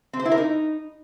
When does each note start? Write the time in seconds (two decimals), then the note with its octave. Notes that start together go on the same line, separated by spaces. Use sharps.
0.13 C4
0.19 C5
0.25 E4
0.31 A#4
0.38 D#4